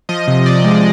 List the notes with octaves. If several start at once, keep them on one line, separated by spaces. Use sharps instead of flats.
F3 D#5
C3
C3 D5
G#3